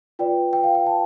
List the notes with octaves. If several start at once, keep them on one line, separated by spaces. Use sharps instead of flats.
F4 B4 D5 G5
G5
F5
G5
A5